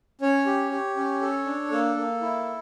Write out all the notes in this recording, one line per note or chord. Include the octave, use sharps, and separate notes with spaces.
C#4 C#5
G4
G4
C#4
A4
D4
A#3 A4
A#3
E4